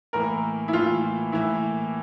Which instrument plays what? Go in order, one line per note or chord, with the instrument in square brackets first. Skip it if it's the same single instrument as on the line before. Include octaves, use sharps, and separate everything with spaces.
[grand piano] A2 E3 A#3 [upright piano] A#4
[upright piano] E4
[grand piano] A2 E3 A#3 [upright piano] F4
[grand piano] A2 E3 A#3 [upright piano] E4